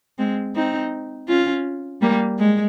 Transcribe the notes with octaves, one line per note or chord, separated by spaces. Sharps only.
G#3 C4
C4 D#4
C#4 F4
G3 A#3
G#3